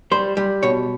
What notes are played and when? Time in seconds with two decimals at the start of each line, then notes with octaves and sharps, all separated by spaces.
0.11 G3 C5
0.37 G3
0.63 B2 C#5